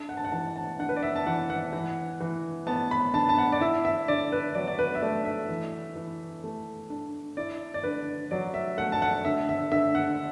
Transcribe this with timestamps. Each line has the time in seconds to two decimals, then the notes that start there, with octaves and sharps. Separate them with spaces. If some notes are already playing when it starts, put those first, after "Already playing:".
Already playing: D4
0.09 F#5
0.17 A5
0.25 F#5
0.32 E3 A5
0.56 A5
0.79 D4 F#5
0.89 B4
0.96 D5
1.03 E5
1.16 A5
1.27 E3 F#5
1.50 F#5
1.73 E3
2.20 E3
2.67 B3 A5
2.91 B5
3.14 D4 A5
3.29 A5
3.38 F#5
3.52 D5
3.61 E4 E5
3.85 E5
4.08 D3 D5
4.32 B4
4.55 F#3 D5
4.68 D5
4.79 B4
4.95 E5
5.02 A3 D5
5.25 E5
5.49 E3
5.96 E3
6.44 A3
6.90 D4
7.37 E4 D5
7.74 D5
7.83 D3 B4
8.31 F#3 D5
8.54 E5
8.77 A3 F#5
8.92 A5
9.02 F#5
9.25 D3 E5
9.49 E5
9.72 D3 E5
9.95 F#5